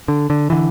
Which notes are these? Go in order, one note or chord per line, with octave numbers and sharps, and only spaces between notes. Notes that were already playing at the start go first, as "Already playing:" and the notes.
D3
D3
D3 E3